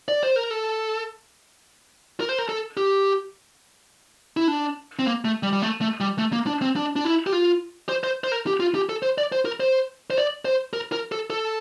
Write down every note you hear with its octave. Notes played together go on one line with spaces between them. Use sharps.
D5
C5
A#4
A4
A#4
C5
A#4
A4
G4
E4
D4
C4
A#3
A3
G3
G3
A3
A3
G3
A3
A#3
D4
C4
D4
D4
E4
G4
F4
C5
C5
C5
A#4
G4
F4
G4
A4
C5
D5
C5
A#4
C5
C5
D5
C5
A#4
A#4
A4
A4